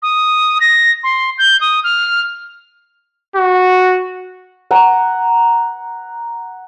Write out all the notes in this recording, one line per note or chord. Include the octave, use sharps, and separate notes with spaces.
D#6
A#6
C6
G6
D#6
F6
F#4
F#5 A#5